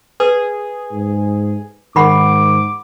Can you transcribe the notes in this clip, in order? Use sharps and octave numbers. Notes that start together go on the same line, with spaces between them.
G#4 B4
G#2
G#2 D#3 F#5 B5 C#6 D6